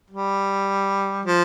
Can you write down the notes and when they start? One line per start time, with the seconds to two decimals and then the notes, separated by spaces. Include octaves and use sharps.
0.10 G3
1.26 F3